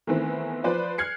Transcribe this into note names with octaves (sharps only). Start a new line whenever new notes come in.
D#3 E3 A3 B3 C4 E4
F3 B4 C5 D5
F6 F#6 G#6 C7 C#7